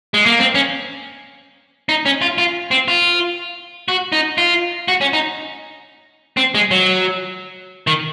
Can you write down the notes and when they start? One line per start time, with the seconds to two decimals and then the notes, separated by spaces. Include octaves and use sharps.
0.14 G#3
0.26 A#3
0.39 C4
0.55 C#4
1.89 D#4
2.06 C#4
2.22 F4
2.38 F4
2.71 C4
2.88 F4
3.88 F#4
4.12 D#4
4.38 F4
4.88 F#4
5.01 C#4
5.13 D#4
6.37 C4
6.55 G#3
6.71 F#3
7.87 D#3